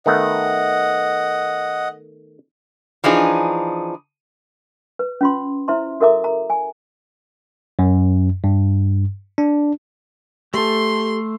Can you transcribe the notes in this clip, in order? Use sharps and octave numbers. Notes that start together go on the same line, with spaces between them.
D#3 A3 B3 D#5 F#5
E3 F3 D4 D#4 G#4
B4
C#4 F4 C6
E4 C5 E5 A#5 C6
F#4 A4 A#4 E5 A#5 D6
A#5
G#5
F#2
G2
D4
A3 G4 A4 C6